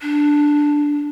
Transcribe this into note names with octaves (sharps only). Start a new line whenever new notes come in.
D4